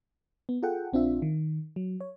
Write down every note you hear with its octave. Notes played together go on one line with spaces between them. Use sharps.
B3
F4 G#4 A4 F#5 G5
A#1 C4 D4 F4 E5
D#3
F#3
C#5